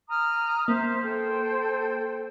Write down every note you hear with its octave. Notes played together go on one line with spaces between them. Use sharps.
A#5 D#6 F6
A#3 C5 E5
A4 C5 G5